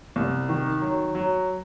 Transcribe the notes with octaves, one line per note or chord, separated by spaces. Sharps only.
C2
D#3
F#3
F#3